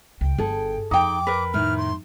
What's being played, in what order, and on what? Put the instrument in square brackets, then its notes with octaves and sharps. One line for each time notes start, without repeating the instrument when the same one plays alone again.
[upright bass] C#2 [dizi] G5
[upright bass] G1 [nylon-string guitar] G#4 A4
[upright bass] F2 [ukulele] D#4 G5 [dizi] D6
[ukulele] A#4 B4
[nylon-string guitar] A2 D#3 [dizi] F6
[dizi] C6